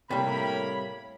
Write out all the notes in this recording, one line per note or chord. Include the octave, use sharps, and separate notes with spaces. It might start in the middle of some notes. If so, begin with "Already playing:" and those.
A2 C3 G3 A#3 C#5 B5